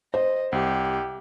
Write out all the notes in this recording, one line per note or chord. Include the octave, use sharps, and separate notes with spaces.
C5 D#5
C2 G4